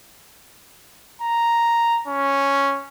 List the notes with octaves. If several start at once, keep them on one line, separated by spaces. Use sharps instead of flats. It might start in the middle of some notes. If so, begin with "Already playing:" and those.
A#5
C#4